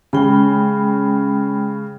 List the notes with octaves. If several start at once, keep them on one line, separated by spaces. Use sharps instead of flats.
C#3 G#3 G5 B5